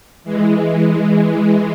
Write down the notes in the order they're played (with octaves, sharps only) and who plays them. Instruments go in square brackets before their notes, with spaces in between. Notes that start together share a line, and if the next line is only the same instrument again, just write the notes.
[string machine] E3 G#3